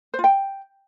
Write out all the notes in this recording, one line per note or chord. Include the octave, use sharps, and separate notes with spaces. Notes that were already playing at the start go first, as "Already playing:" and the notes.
C5
F4
G5